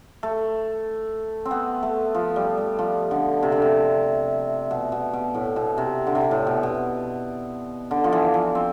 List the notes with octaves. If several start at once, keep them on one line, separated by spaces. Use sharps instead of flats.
A3
C4
B3
A3
F3
G3
G3
F3
D3
C3
D3
C3
B2
B2
B2
A2
B2
C3
D3
C3
A2
B2
B2
D3
F3
E3
F3
C4